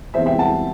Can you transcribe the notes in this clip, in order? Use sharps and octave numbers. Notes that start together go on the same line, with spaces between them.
E2 C3 E3 B3 C5 E5
E5 G5
F#5 A5